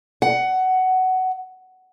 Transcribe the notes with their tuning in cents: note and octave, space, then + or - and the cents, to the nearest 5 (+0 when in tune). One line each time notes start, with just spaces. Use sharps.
F#5 +15